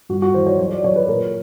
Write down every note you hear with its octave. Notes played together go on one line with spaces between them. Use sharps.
G2 F#4
F#4
E3 C5
C#5
F#3 C#5
D5
F#3 C#5
B4
A#2 A#4